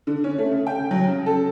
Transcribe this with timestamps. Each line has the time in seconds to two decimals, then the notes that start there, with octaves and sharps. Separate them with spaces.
0.07 D3
0.24 C#4
0.38 A3
0.51 C#3
0.67 G5
0.91 F#3
1.07 C#3
1.26 A4